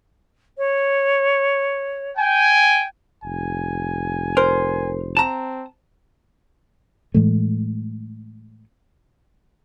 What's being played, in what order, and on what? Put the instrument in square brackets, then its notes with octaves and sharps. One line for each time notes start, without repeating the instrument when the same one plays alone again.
[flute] C#5
[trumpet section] G5 G#5
[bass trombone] F1 [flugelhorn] G#5
[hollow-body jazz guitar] A#4 [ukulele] C5
[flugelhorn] C4 [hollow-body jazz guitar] A5 A#5
[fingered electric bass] A2 E3 G#3 A3